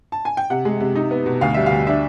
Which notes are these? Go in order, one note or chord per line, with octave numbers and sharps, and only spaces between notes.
A5
G#5
G5
C3 F#5
G#3
C3
D#4
B3
B2
D2 F5
G3 E5
F5
D2
D4 E5